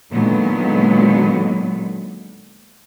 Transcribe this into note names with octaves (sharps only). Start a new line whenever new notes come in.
A#2 D3 D#3 F#3 G#3 B3